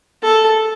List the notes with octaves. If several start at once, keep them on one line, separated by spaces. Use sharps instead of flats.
A4